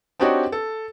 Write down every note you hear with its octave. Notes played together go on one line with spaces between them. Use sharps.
C4 D4 D#4 F#4 G4 C#5
A4